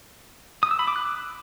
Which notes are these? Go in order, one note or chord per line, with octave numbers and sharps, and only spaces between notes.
D#6
E6
B5
D6
F#6